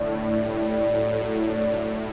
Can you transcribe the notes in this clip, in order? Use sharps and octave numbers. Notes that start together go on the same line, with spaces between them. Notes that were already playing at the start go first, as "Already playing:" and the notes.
Already playing: A2 D3
D4
G3
G3
A2 F#3
F#3
D4
F#3